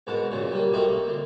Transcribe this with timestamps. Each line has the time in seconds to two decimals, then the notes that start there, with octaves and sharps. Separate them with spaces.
0.07 G#2 B2 A#4 F#5 A5
0.31 A#2 C#3 F#3
0.51 G3 A#3
0.73 A3 A#3 C4 F#4 A#4 D#5
0.88 A#3
1.07 D2 C6